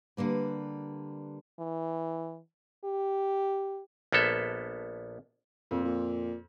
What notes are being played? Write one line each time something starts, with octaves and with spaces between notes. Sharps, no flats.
D3 G3 A#3 B4
E3
G4
A#1 A#3 B3 A4 E5
F2 A#2
A#2